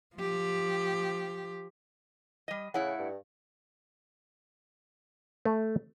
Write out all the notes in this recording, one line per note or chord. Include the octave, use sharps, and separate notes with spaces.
F3 G4
G3 D#5
A2 C#3 E4 F#5
G2
A3